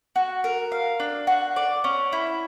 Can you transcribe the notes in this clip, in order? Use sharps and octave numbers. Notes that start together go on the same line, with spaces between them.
F#4
A#4
F5
D4
F#4
D5
C#4
E4